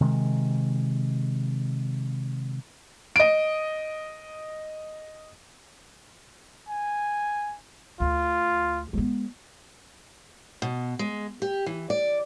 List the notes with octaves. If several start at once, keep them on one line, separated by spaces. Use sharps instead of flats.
C3 D#3 G#3
D#5 D7
G#5
D2 F4
G#3 B3
B2
G#3
G4
E3
D5